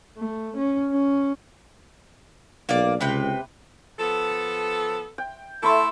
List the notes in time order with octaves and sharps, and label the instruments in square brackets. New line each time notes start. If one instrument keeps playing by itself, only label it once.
[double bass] A3
C#4
C#4
[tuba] B1 [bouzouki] A#3 D5
[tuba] C#2 [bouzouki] C3 B4 G5
[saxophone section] F3 B3 A4
[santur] G5
[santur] A3 B5 C6 [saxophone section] E4 A4